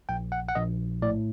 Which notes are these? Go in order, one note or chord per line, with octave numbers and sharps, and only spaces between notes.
A#1 G5
F#5
F#5
A#1 D#5
A2 D5